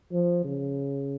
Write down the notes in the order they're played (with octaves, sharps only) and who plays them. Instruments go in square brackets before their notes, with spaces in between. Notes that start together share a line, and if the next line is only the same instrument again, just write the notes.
[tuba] F3
C#3